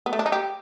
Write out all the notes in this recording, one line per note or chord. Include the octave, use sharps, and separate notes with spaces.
B3
A3
D4
D#4
G4